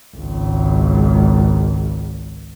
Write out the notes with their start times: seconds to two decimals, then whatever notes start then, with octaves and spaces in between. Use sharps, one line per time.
0.16 G#1 C#2